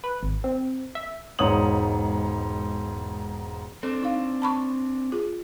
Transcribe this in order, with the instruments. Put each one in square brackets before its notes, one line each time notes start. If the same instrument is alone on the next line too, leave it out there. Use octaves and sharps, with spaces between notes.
[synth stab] B4
G#1
C4
E5
[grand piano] E1 G#2 C#5 D#6 F#7
[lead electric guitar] C4 D4 [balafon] A4
[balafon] D#4 F5
A5 B5 C#6
F4 G#4